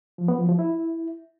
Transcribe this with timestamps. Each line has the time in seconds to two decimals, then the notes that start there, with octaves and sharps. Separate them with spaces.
0.18 F3
0.28 B3
0.39 F3
0.49 F3
0.59 E4